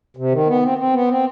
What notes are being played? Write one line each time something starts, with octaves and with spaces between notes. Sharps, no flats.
C3
D#3
B3
C4
C4
B3
C4